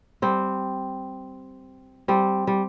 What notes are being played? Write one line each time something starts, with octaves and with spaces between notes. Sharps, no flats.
G3 C4
G3 C4
G3